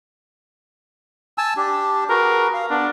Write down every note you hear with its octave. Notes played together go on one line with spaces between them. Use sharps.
G#5 A5 E6
D4 G4
F#4 G#4 A#4 B4
F5
B3 D4